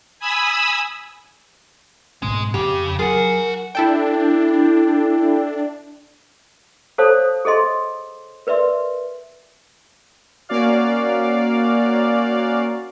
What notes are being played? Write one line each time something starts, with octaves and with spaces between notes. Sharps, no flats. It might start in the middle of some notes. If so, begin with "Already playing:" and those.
G#5 B5 D#6 E6
G#2 B2 G#3 C#4
F2 C#3 G4
F#3 F4 G#4 A#4 F#5
D4 E4 A4 G5
A4 C5 C#5 F5 A5 D#6
G#4 A4 D#5 C6
A#4 B4 D5 E5 C6
A#3 C#4 F#4 D5 F5